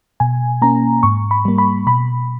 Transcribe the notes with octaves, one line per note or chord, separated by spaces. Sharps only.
B2 G#5
A#3 C#4 A#5
G#2 C#6
B5
G3 A#3
B5
B2 B5